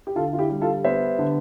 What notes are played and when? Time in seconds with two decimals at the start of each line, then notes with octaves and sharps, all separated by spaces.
0.07 G4
0.15 D3 F4 A4
0.33 F4
0.38 E4 G4
0.50 G3
0.62 F4 A4
0.84 B3 C5 E5
1.18 D3